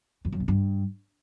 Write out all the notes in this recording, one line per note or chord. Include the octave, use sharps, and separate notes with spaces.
F2
F#2
B2
G2